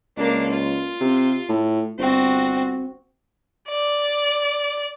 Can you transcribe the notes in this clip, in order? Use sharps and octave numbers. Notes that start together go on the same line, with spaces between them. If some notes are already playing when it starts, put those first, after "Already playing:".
C#2 A#3 D4
F4
C3
A2
G1 C4 F#4
D5